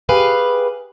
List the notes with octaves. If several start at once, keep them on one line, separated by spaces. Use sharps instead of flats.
G4 G#4 B4 F5